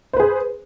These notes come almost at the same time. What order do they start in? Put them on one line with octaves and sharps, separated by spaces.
C5 B4 G#4